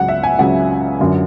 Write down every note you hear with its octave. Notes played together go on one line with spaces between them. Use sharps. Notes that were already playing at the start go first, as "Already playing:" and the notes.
Already playing: C#2 C#3 F#3 F#5
E5
G#5
C#2 C#3 F#3 F#5
F#2 D3 F#3